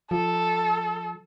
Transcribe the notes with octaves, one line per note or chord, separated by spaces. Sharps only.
F3 A4